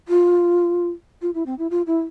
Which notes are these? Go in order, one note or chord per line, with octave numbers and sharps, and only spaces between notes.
F4
F4
E4
C4
E4
F4
E4